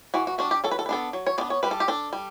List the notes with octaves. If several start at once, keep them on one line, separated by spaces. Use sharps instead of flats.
E3 F#4
F#4
G3 D4 F#4
G4
F#3 A4
B4
A4
B4
B3 D4 A4
F#3
C#5
B3 D4 D5
C#5
G3 B4
A4
G4
D4 A4
G3